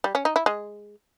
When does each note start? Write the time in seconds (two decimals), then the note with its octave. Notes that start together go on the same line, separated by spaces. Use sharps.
0.04 G3
0.15 C#4
0.25 D#4
0.36 E4
0.46 G#3